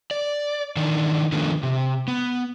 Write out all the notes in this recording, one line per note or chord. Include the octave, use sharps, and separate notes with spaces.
D5
D#3 E3 D4 D#4
D#3 F3 A3 B3 D4
C3
B3